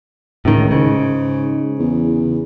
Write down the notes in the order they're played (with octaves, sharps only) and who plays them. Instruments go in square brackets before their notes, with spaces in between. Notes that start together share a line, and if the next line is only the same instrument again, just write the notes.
[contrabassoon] C#2 [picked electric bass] A2 D#3
[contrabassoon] G#2 [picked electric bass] C#3
[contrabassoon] E2